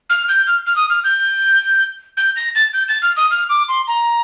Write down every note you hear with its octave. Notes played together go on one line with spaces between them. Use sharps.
F6
G6
F6
F6
D#6
F6
G6
G6
A#6
A6
G6
A6
F6
D#6
F6
D6
C6
A#5